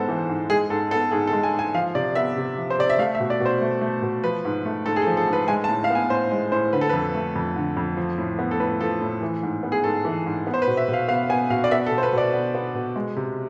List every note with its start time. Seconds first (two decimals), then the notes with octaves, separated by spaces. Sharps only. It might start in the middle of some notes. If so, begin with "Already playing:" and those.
Already playing: G#2 G#3 B3 A4 C5
0.08 E3
0.29 G#2
0.50 G#3 G#4
0.70 G#2 A4
0.91 B3 A4
1.12 G#2 G#4
1.27 A4
1.33 G#3
1.43 G#5
1.53 G#2
1.59 G#5
1.74 F3 F5
1.95 C3 D5
2.15 B3 E5
2.37 C3
2.57 F3
2.70 C5
2.79 C3 D5
2.90 E5
2.98 A3 F5
3.15 E5
3.20 B2
3.30 D5
3.40 B2
3.45 C5
3.61 A3
3.81 A3
4.02 B2
4.24 F3 B4
4.45 G#2
4.65 A3
4.86 G#2 A4
4.96 G#4
5.02 A4
5.07 F3
5.17 A4
5.28 G#2
5.33 B4
5.48 G#3 G#5
5.64 A5
5.69 A2
5.84 F5
5.90 B3 G#5
6.10 A2 C5
6.31 G#3
6.52 A2 C5
6.73 D3 B4
6.81 A4
6.89 F2 B4
7.14 A3
7.36 F2
7.56 D3
7.77 F2
7.97 F3
8.18 A2
8.39 B3
8.51 A4
8.60 A2 B4
8.80 F3 A4
9.01 A2
9.22 E3
9.43 G#2
9.63 B3
9.72 G#4
9.84 G#2 A4
10.05 E3
10.26 G#2
10.47 B3
10.54 C5
10.62 B4
10.67 B2
10.77 E5
10.88 B2
10.93 F5
11.08 B3 F5
11.29 B3 G#5
11.50 B2 F5
11.64 D5
11.71 B3 E5
11.86 A4
11.92 B2
11.98 C5
12.03 B4
12.13 B2 D5
12.33 B3
12.55 B3
12.75 B2
12.96 G#3
13.16 C3